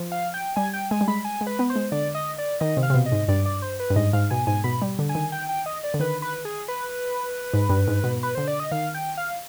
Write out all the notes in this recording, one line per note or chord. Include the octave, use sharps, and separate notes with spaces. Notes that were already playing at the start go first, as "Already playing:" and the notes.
Already playing: F3
F5
G5
G3 G#5
G5
G#3 G#5
G3
G#3 B5
G#5
G#3
B4
B3
C5
G#3
D3 D5
D#5
D5
D#3 D#5
C3
F5
C3
B2
D#5
G#2
G2 D5
D5
C5
B4
G2
G#2 D#5
G#2 F5
B2 G#5
G#2 G#5
B2 B5
G3
D3
G#5
D#3
G5
G5
D#5
D5
D3
D#3 B4
B4
G#4
B4
G#2
G2
G#2
B2
B4
D3 C5
D5
D#5
D#3 F5
G5
F5